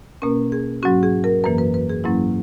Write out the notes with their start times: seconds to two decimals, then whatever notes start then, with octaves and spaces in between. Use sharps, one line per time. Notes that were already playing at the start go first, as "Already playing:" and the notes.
0.22 B2 A#3 C#4 A#4
0.52 G#4
0.83 G#2 F#3 C#4 F#4
1.03 G#4
1.24 A#4
1.44 F#2 E3 A#3 B4
1.58 B4
1.74 B4
1.90 G#4
2.04 G#2 F#3 A#3 C#4 E4